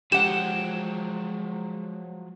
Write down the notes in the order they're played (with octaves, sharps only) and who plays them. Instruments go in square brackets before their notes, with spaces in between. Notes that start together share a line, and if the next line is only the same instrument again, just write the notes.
[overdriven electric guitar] F3 F#3 [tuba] G#3 [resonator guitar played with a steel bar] G4 F#5 [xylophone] E7